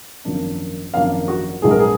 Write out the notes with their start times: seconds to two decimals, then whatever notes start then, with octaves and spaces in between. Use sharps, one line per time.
0.25 G#1 F#2 F3 A#3 D4
0.94 G#1 F#2 F3 A#3 D4 F5
1.28 F#4
1.62 A#1 G#2 F#3 B3 D4 G#4
1.71 A#4
1.80 G#4